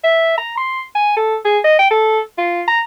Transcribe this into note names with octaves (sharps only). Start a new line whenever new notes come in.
E5
A#5
C6
G#5
A4
G#4
D#5
G5
A4
F4
A#5